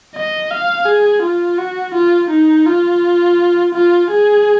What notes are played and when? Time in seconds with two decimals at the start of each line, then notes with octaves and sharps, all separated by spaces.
0.15 D#5
0.51 F5
0.86 G#4
1.22 F4
1.58 F#4
1.94 F4
2.30 D#4
2.66 F4
3.74 F4
4.11 G#4